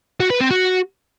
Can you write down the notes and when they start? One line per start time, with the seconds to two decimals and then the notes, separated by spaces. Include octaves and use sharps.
0.20 F#4
0.30 B4
0.41 C4
0.51 F#4